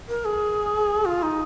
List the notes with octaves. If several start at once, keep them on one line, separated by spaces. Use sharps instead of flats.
A#4
G#4
F4
D#4